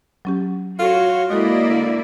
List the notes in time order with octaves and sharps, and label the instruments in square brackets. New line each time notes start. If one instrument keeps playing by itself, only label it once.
[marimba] F#3 C#4 G4
[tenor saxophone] F4 [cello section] F#4 C#5 [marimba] A4
[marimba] G#3 F#4 A4 [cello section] A#3 E4 D5 [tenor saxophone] D#5
[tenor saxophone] D3